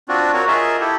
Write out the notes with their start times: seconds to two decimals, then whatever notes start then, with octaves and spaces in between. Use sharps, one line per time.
0.09 C4 D4 F4 F#4
0.33 C4 F#4 A#4 C#5
0.47 F4 G#4 A#4 D#5 E5
0.80 E4 G4 A4